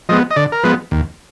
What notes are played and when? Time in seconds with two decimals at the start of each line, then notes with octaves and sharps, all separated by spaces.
0.09 F3 G#3 B3 D#5
0.31 D#5
0.36 D3 D5
0.52 A#4
0.63 F3 G#3 B3 B4
0.91 D#2